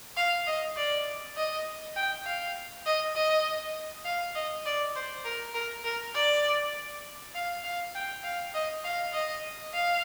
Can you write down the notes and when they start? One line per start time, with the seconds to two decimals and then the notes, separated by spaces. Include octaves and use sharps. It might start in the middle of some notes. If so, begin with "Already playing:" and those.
0.17 F5
0.46 D#5
0.77 D5
1.36 D#5
1.96 G5
2.25 F5
2.86 D#5
3.15 D#5
4.05 F5
4.35 D#5
4.66 D5
4.95 C5
5.25 A#4
5.54 A#4
5.84 A#4
6.15 D5
7.35 F5
7.64 F5
7.95 G5
8.23 F5
8.54 D#5
8.85 F5
9.13 D#5
9.74 F5